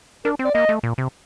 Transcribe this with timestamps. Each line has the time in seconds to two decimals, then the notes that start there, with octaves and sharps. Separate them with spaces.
0.25 D4 A#4
0.39 C4
0.45 D5
0.54 A#3 D#5
0.69 A3
0.83 A#2
0.98 C3